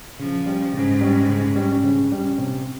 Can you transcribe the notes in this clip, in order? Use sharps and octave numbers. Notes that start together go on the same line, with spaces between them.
C#3 F3
G3 C#4
G#2 C#3
G3 C#4
C#3
G3 C#4
C#3
G3 C#4
C3